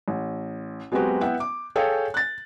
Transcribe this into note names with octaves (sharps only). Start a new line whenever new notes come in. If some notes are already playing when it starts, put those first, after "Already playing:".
A1
F#3 G#3 B3 C4 F#4 G4
B3 E4 E5 F#5 G5
D6
G#4 A4 C#5 F5 G5
F#6 A6